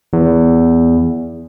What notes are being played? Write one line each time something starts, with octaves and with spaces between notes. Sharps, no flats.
E2